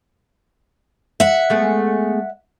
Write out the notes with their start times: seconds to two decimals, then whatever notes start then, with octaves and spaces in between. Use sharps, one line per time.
1.20 E5 F#5
1.50 G#3 A3 B3